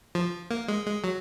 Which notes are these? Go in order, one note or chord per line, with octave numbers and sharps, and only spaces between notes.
F3
A#3
G#3
G#3
F#3